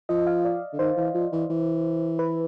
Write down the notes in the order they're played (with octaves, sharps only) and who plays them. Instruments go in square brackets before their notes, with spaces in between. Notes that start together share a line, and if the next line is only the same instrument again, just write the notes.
[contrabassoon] F3 [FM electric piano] D#5
[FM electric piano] F5
D5
[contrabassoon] D3
[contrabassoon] D#3 [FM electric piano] C5
[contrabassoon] E3
F3
E3
E3
[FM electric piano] B4